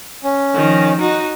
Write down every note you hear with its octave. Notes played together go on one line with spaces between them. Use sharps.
C#4
D#3 F3
D#4 F#4